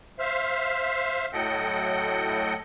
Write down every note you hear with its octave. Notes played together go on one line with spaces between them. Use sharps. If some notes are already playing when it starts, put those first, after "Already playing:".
C5 E5 F5
A2 F#3 A4 D#5 F#5 G5